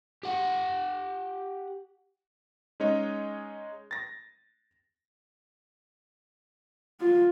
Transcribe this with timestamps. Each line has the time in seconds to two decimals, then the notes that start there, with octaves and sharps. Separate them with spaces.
0.23 G4 F#5
2.80 G#3 C#4 D#4 C#5 D#5
3.91 A6 A#6
7.00 F4